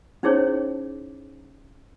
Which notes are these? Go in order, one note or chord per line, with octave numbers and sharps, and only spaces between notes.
C#4 D#4 E4 G#4 C5 C#5